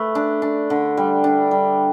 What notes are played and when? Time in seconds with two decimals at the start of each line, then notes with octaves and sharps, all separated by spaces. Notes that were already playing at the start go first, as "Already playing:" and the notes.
Already playing: A3 B4
0.15 D4
0.42 D4
0.70 D3
0.97 G3
1.24 D4
1.51 G3